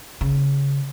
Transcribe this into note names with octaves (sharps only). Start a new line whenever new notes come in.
C#3